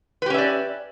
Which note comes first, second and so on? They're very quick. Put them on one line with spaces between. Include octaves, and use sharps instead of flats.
B4 G4 C#4 E5 D5